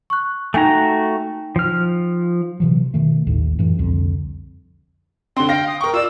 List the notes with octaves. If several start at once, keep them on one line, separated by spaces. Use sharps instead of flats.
C#6 F#6
A3 D#4 F#4 G5 G#5 A#5
F3 F6
C3 E3 F#3
B2 D#3 A3
A1 D#2 A2
F#2 A2 E3
C2 F2 D3
D3 C4 C6
F5 G5 A#6
D#6
A#4 G5 C#6
F4 D5 E6